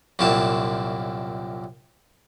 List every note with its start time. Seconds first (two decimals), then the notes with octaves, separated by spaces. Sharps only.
0.19 C2 F#2 A#2 C4 A5